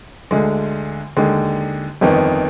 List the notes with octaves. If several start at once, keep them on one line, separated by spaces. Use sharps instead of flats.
D2 D3 G#3
D#2 D3 G#3
G1 F2 D#3 B3